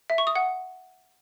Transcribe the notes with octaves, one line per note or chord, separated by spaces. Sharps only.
E5
C#6
D#6
F#5